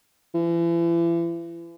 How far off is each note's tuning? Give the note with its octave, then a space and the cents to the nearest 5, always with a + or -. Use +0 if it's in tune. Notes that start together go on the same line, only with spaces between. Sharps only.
E3 +40